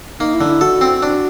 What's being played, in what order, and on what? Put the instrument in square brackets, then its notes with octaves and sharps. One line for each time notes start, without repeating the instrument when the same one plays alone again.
[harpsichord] A#3 [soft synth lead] D#4
[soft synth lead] E4
[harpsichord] D3
[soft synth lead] E4
[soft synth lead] F#4 [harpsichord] A4
[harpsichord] C4
D4